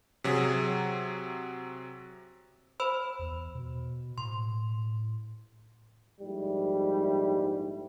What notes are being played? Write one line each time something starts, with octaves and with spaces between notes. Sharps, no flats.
C3 F#3 G#4
C5 B5 E6
E2
B2
A2 C6
A#1 G#2 G3 A3 E4